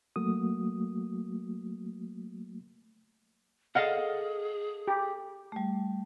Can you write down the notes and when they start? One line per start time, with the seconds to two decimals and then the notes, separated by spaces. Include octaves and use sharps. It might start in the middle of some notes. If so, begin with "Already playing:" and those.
0.16 F#3 A3 A#3 F#4 D#6
3.75 G#4 A4 D#5 F5 F#5
4.88 G4
5.52 G3 A3